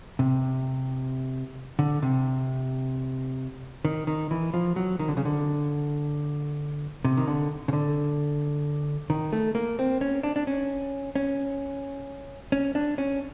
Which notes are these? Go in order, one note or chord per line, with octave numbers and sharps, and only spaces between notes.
C3
D3
C3
D#3
D#3
E3
F3
F#3
D#3
D3
C#3
D3
C3
D#3
D3
C#3
D3
D#3
A3
A#3
C4
C#4
D4
D4
C#4
C#4
C#4
D4
C#4